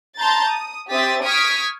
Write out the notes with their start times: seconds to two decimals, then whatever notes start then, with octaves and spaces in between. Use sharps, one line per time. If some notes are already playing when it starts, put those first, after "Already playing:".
0.18 A5 A#5 C6 G6 A6
0.49 D#6
0.91 C4 G4 E5 D#6 A6 B6
1.25 C#6 D#6 F6 G#6 B6 D7